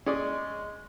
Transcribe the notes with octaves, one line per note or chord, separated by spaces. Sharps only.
G#3 C#4 G#4 D5